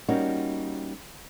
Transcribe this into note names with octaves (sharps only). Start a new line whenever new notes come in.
G3 A#3 C#4 D#4 F#4